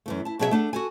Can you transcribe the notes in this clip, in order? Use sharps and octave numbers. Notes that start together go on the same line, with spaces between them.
F#2 E3 A3
E4 A5
B2 F#3 F#4 G#4 B4 E5
A3 D4 F#5
F#4 A4 G#5